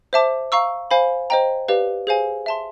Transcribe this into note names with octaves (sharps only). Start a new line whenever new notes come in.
C5 E5 A5 D6
F5 A#5 C#6 E6
C5 F5 G#5 B5
C5 D#5 G5 A#5
G4 B4 D5 F5
G#4 C5 F5 G#5
E5 A5 C6